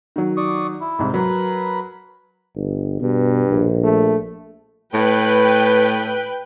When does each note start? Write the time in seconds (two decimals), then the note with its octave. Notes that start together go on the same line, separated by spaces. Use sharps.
0.16 D#3 F#3
0.37 D5 C#6 D#6
0.81 E4
0.99 C2 G#2
1.14 F#3 A#4 B4 B5
2.55 G1
3.01 G2 B2
3.49 A#1
3.84 A3
4.94 A2 B4 G5